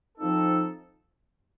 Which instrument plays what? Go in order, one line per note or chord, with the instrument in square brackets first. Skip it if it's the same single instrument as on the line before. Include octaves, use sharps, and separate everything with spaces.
[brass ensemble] F3 C4 D#4 A4